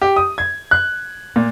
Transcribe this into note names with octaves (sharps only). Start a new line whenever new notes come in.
G4
D#6
G#6
F#6
A#2